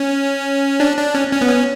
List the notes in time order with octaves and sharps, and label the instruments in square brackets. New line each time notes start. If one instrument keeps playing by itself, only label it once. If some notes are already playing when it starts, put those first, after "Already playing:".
Already playing: [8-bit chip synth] C#4
D4
D4
C#4
C#4
B3
C#4